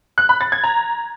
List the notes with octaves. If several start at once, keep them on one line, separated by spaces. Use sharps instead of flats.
F#6
B5
A6
G#6
A#5